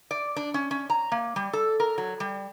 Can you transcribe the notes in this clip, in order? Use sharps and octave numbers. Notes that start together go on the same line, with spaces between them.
D5
D4
C#4
C#4
A#5
A#3
G3
A4
A#4
F#3
G3